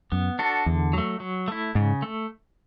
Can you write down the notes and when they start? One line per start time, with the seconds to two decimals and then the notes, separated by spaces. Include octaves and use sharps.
0.12 F#2 B3
0.39 D4 F#4 A4
0.66 E2 D3
0.93 F#3 A3
1.20 F#3
1.48 A3 E4
1.75 G#2 C#3
2.02 A3